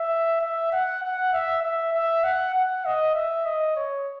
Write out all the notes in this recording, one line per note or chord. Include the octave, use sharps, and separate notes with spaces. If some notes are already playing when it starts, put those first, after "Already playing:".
Already playing: E5
E5
F#5
F#5
E5
E5
E5
F#5
F#5
D#5
E5
D#5
C#5